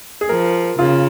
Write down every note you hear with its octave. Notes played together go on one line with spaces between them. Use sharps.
G#4
F3 A#4
C#3 F4